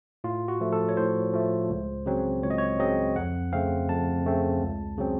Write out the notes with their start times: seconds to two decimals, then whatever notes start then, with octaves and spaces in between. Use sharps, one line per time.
0.24 A2 F4
0.48 F#4
0.61 F3 A3
0.73 A4
0.89 C#5
0.97 A2 C5
1.33 F3 A3
1.70 C#2
2.06 C#3 F#3 C4
2.43 C#2 C#5
2.50 D#5
2.58 C#5
2.80 C#3 F#3 C4 D#5
3.16 F2 F#5
3.53 C#3 A3 C4 F5
3.89 F2 A5
4.25 C#3 A3 C4
4.62 C#2
4.98 C#3 F#3 C4